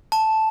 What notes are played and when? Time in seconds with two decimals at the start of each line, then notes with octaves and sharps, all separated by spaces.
0.12 A5